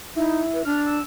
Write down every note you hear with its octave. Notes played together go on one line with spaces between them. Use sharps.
D#4 E4
B4
D4 F6
E6